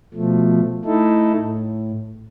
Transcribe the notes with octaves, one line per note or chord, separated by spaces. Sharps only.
B2 F3 A3
A3 D#4 E4 A4
A2